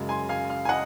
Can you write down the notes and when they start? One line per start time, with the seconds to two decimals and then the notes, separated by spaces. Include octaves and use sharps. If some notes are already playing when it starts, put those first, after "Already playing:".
Already playing: F#2 C#3 G#3
0.09 G#5 C6
0.29 F5 G#5
0.50 F5
0.65 G#5
0.69 D#5 F#5